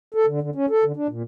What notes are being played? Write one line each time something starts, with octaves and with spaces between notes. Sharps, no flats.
A4
D3
D3
C#4
A4
D3
D4
A#2